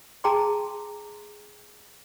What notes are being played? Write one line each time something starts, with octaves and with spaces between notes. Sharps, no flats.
G#4 G5 A5 A#5 C6 D6